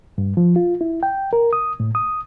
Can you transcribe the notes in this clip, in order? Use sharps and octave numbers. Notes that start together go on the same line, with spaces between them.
G2
F3
F4
E4
G5
A#4
D#6
A2
D#6